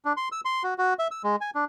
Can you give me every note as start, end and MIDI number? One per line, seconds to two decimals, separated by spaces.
0.05 0.13 62
0.17 0.29 84
0.32 0.41 88
0.45 0.63 84
0.63 0.74 66
0.78 0.94 66
0.99 1.08 76
1.11 1.22 88
1.24 1.36 56
1.41 1.50 80
1.55 1.65 62